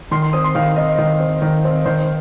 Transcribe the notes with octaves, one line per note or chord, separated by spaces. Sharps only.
D#3 C6
C6
C4 D#6
C6
D#3 F5
C4 D#5
D#3
C4
D#3
C4
D#3 C5